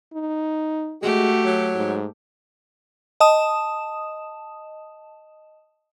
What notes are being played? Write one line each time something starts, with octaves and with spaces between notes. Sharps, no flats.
D#4
G#3 A3 F#4 G4
F#3
G#2
D#5 A5 D#6 E7